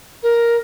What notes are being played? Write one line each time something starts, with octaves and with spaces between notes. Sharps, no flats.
A#4